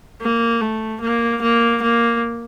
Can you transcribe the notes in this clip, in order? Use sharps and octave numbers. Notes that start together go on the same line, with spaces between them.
A#3
A3
A#3
A#3
A#3